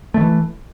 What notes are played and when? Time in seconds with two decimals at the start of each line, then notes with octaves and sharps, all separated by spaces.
0.14 A3
0.18 D#3
0.21 E3